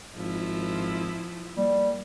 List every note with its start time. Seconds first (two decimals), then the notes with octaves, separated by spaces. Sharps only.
0.16 G#1 F3 E4
1.57 G3 A#3